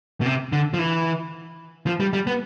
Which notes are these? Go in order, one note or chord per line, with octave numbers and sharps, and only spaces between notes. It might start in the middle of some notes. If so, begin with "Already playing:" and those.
B2
C3
D3
F3
E3
F3
G3
G3
B3